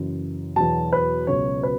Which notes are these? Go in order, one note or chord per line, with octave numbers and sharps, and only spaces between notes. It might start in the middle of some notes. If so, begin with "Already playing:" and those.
Already playing: F#1 F#2 E3
E2 B2 F#3 A5
B4
C#2 B2 F#3 C#5
B4